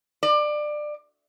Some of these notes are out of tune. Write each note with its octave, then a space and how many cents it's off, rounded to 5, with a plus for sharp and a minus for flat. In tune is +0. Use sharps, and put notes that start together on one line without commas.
D5 +20